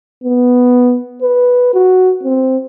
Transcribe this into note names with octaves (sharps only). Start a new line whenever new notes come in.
B3
B4
F#4
C4